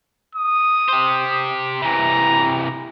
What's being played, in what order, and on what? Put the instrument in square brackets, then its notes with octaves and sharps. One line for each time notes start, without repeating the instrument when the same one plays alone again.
[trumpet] D#6
[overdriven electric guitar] G4 C5
[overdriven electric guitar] C3 E3 [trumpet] A#5